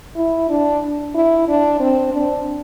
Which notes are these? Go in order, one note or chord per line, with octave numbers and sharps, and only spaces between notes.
E4
D4
E4
D4
C4
D4